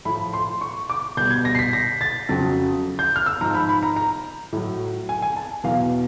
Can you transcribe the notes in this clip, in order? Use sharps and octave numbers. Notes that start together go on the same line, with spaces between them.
A2 F3 B5
C6
C#6
D6
B2 G3 G6
G#6
A#6
C7
B6
A#6
A6
F2 C#3 F#3
G6
F6
E6
G#2 F3 A#5
B5
B5
A#5
A#5
A2 F#3
G#5
G#5
A5
E2 B2 F#3 F5